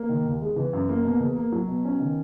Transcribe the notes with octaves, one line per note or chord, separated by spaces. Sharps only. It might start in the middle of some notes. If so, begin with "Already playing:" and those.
Already playing: A#3
D#3
D#2
G#3
E3
F#2
A#3
B2
E2
A#3
F#3
B2
C#4
D#3